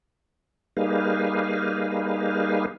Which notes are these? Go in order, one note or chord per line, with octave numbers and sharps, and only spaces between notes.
G3 A#3 D#4 G#4 B4 F5